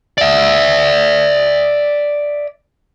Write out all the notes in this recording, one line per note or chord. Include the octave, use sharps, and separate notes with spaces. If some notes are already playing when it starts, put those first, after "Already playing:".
D5 E5